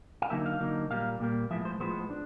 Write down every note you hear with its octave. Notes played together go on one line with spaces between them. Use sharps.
F5
D3 F#3 A#3 D#4 E5
F5
D3 F#3 A#3 D#4
A#2 G3 A#3 F5
A#2 G3 A#3
A2 F3 G#3 B3 E5
C5
A2 F3 G#3 B3 C5
D4